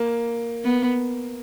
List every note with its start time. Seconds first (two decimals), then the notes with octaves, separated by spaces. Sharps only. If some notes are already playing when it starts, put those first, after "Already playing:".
Already playing: A#3
0.64 B3